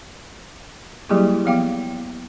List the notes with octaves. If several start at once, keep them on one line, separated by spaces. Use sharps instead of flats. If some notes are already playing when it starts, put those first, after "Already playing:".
F#3 G3 A#3 E4 G4 G#4
F3 B3 F5 G5 D6